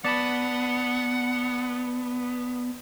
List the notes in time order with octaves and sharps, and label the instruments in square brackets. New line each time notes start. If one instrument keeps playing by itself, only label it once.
[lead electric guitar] B3 [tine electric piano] D5 A5 B5 [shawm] F#5